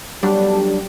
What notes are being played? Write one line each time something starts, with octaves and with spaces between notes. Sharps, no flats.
F#3 G3 A3 B3 D4 G4